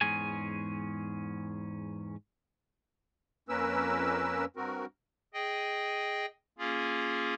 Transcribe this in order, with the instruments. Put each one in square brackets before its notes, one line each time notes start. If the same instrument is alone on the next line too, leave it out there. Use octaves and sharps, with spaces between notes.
[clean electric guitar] E2 G#2 C#4 G#4 G#5
[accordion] F2 A#3 C#4 A#4 B4 E6
G2 C4 F#4 A#4
[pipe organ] G#4 D#5 G5
A#3 C#4 F4 G#4